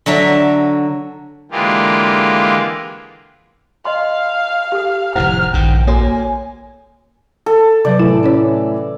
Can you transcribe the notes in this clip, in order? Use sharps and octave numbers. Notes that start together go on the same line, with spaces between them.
D3 F#3 A4 E5 A#5
D3 E3 G#3 A#3 F4 G4
D#5 F5 C6
G4 A4
F1 D#2 A2 E4 C5 F#5 F6
A#1 G2 D#3 G5
A#3 F#4 A4 C#5 G#5
A4
C3 F#3 B4 D5
A2 E3 E4
C#4 E4 C#5